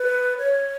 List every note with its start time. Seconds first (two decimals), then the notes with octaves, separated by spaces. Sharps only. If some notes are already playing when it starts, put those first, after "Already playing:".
Already playing: B4
0.38 C#5